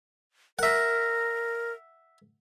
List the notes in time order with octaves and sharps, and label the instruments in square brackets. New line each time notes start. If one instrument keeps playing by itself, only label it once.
[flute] A#4 [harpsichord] E5 F#5